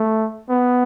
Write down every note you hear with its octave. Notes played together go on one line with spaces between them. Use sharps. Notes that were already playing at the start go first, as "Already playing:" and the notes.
Already playing: A3
B3